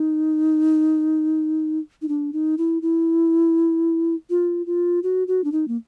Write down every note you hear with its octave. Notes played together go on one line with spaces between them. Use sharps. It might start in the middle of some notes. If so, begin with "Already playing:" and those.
Already playing: D#4
D#4
D4
D#4
E4
E4
F4
F4
F#4
F#4
D4
D#4
A#3